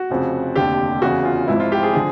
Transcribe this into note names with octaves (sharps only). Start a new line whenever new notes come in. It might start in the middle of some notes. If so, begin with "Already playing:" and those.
Already playing: F#4
F1 F2 C#3 F3
F1 D#2 D3 G4
E2 C#3 E3 F#4
F4
G#1 G#2 F3 E4
F4
G4
G#4
D3 F3 G#4